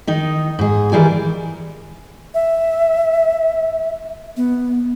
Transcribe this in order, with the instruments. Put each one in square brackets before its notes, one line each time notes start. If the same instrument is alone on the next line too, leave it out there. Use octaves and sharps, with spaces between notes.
[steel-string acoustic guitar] D#3 D#4
G#2 G#4
D#3 E3 G3 G#5
[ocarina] E5
B3